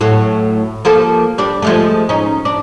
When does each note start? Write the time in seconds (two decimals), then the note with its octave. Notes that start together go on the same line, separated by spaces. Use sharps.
0.01 A2 F#3 A4
0.85 F3 A#3 A4
1.38 G3 D4
1.62 F3 G#3 A3
2.09 C#4 D#4
2.45 D4